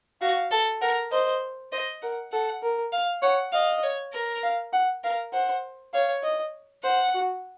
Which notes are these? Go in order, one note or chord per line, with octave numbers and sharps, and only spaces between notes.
F#4 F5
A4
A#4 F#5
C5 D#5
C5 D#5
A#4 F#5
A4 F#5
A#4
F5
C#5 F#5
D#5 F5
C#5
A#4
F5
F#5
A#4 F5
C5 F#5
C#5 F5
D#5
C5 F#5
F#4